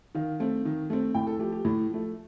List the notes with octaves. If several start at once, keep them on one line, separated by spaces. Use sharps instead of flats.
D#3 F5
A3 C4
D#3
A3 C4
A2 G5
A4
F3 A3 G4
G4
A2
F3 A3